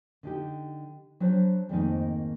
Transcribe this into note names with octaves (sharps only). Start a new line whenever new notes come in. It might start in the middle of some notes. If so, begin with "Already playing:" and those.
D3 D#4 G4
F#3 D4 B4 C5
F2 G#2 D#3 A3 A#3 D#4